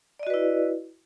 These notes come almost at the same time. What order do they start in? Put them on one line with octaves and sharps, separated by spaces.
D5 D#5 F#4 B4 E4